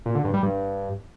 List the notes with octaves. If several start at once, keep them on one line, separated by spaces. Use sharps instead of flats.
A#2
D3
G2
G3
G2